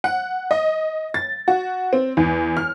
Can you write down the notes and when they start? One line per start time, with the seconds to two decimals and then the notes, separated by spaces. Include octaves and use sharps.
0.04 F#5
0.51 D#5
1.14 A6
1.48 F#4
1.93 C4
2.17 E2
2.57 F6